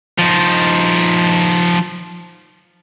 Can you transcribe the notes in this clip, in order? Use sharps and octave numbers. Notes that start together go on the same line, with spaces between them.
F3 D#4